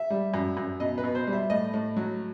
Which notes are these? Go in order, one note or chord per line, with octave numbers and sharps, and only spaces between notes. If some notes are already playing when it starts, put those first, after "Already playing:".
Already playing: E5
G3
F#2
F#2
B2 D#5
B4
B2
C5
G3
E5
A2 D#5
A2
F#3